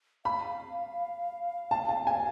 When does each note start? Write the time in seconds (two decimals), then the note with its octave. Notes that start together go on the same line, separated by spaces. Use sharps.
0.25 F5 B5
1.71 A5
1.89 A5
2.07 G#5